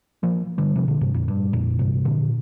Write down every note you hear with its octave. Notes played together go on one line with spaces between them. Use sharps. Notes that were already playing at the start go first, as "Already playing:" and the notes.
F3 A#3
D3 G3
C3 F3
A#2 D3
G2 C3
F2 A#2
G2
F2 A#2
G2 C3
A#2 D3